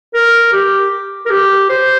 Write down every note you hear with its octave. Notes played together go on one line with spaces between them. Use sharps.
A#4
G4
A#4
G4
C5